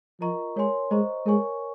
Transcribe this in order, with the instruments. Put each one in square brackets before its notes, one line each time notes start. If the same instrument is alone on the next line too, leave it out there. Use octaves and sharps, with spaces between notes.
[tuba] F3 [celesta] F4 A#4 D#5 A#5 C#6
[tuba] G#3 [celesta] A#4 C#5 G#5 C6
[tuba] G#3 [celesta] C5 D#5 A#5 C#6
[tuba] G#3 [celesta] A#4 C#5 G#5 C#6